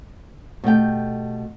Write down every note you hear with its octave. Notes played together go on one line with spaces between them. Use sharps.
B2 A3 G4 G5